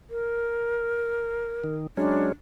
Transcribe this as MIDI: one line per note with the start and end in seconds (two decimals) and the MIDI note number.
0.10 1.74 70
1.64 1.87 51
1.97 2.32 54
1.97 2.32 56
1.97 2.32 61
1.97 2.25 62